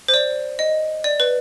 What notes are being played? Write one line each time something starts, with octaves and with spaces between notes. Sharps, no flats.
C5
D5
D#5
D5
B4